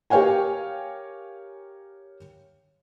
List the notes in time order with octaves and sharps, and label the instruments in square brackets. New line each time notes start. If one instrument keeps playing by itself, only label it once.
[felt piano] G4 A#4 C#5 F5 G5 G#5